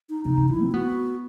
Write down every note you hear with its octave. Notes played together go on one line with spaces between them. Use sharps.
D#4
C3 D#4
C3
D#3 E4
C4
B3 F#4